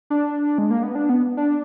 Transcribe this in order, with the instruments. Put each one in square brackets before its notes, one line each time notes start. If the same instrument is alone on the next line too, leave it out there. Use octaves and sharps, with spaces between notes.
[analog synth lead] D4
G#3
A#3
B3
D4
B3
D4